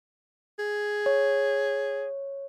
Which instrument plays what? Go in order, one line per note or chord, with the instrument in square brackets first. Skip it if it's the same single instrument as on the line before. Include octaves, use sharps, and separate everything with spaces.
[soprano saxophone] G#4
[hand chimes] C#5